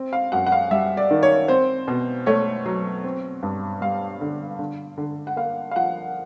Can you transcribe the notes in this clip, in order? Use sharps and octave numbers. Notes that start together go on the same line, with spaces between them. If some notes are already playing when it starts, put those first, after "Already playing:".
Already playing: C4
F5
F#2 F#5
F#5
F5
G3 E5
D5
D#3
C#5
C4 C5
B2
A3 C#5
F#3
C4
G2
G3 F5
D3
D3
D3
F#5
A#3 F5
F5
F3 F#5